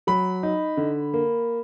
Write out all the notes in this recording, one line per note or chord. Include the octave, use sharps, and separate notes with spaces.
F#3 B5
D#4
D3
A#3